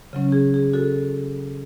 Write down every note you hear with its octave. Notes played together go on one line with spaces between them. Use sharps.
C#3 F#3 C#4
G#4
G#4
F#4 A4